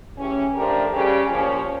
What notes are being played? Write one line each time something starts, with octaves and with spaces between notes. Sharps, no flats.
C#3 E3 A3 C#4 G4
F3 A3 D4 G4 A#4
C#3 G3 C#4 G4
A#2 F3 C#4 F4 C#5